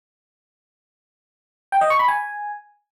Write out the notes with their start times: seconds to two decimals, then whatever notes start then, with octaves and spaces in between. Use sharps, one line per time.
1.72 G5
1.81 D#5
1.90 C#6
1.99 B5
2.08 G#5